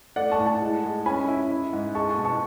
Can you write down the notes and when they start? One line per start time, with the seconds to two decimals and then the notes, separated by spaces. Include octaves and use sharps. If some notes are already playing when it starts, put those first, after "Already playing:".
0.16 A3 D5 F#5
0.32 A5 C#6
0.39 A2
0.46 F#5 A5
0.61 G#3
0.84 G#3
1.06 C#4 G#5 B5
1.28 E4
1.51 E4
1.73 G#2
1.95 G#3 A5 C#6
2.10 A5 C#6
2.18 B2
2.25 A5 C#6